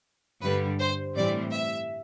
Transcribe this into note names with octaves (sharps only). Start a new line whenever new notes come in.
G2 D3 G3 B4
C5
A2 E3 G3 C4 D5
E5